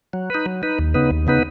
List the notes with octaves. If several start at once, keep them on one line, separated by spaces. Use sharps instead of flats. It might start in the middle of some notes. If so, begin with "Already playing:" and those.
F#3
D#4 B4
F#3
D#4 B4
D#2
C#3 B3 D#4 B4
D#2
C#3 B3 D#4 B4